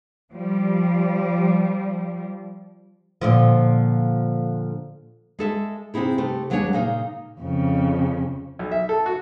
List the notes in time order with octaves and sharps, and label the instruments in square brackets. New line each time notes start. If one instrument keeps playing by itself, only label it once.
[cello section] F3 G3
[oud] A#2 D3 F3
[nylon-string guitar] G#3 A4 E5
C3 C4 D#4 E4 G#4
C3 A3
D#2 F#3 G#3 D4 C#5 G#5
A#2 C#3 A#3 D#4
[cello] F2 C#3
[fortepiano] B1
E5
A4
F#4